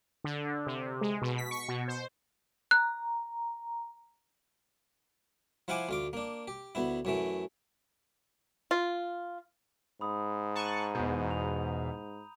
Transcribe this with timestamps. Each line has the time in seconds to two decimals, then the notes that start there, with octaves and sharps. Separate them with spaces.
0.24 D3
0.66 C3
1.01 G#3
1.22 B2
1.38 B6
1.51 C#6
1.68 B2
1.88 C5
2.71 A#5 F#6
5.68 F3 E4 F5 F#5 G#5 D6
5.89 D2 F4 D6
6.13 A#3 D4
6.48 G4
6.75 D2 B3 E4
7.05 F#2 E3 A3
8.71 F4
10.01 G#2 B5 D#6
10.56 A5 A#5 C#6 F#6 D#7
10.95 E2 B2 G6
11.31 F7